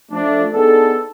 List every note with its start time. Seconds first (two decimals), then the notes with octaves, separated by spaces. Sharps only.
0.11 F3 A3 D4
0.53 B3 D4 D#4 G#4 A4